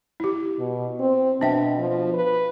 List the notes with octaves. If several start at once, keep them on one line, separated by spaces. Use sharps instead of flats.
E4 G4
B2
C4
B2 D4 E5 G5
F3
B4